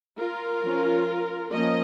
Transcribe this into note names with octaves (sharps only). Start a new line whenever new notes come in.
F4 A#4
F3 C#4
F3 A#3 C#4 A#4 D#5